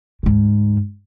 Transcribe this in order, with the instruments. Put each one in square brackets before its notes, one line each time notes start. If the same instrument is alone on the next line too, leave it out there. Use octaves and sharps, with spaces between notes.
[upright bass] D2 G#2